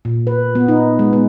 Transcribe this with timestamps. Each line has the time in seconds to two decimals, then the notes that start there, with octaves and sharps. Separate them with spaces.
0.05 A#2
0.27 B4
0.55 B3
0.68 D#4
0.99 G#3
1.13 B3